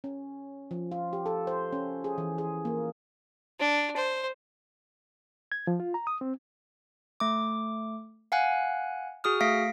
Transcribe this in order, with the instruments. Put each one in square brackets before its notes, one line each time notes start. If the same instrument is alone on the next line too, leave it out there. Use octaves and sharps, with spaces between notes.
[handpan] C#4
F3
F4
G4
A4
C5
C#4
G#4
E3
G#4
A#3
[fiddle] D4
C5
[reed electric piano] G#6
F3
F4
A#5
D#6
C4
[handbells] A3 D6
F5 F#5 G#5 F#6
F#4 G#4 D#6 F6
A3 F5 A#6 B6 D7